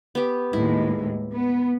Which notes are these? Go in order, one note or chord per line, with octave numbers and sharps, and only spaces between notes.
B3 G4
D#2 A2 G#3 E4
B3